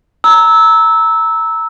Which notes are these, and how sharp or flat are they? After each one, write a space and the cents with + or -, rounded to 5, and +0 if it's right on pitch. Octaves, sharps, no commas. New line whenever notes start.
A#5 -10 E6 -15